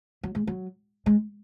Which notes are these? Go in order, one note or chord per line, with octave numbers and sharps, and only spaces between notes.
F#3
G#3
F#3
G#3